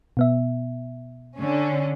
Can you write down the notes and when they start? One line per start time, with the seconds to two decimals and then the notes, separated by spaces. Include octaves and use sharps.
0.17 B2 B3 E5
1.39 D3 C#4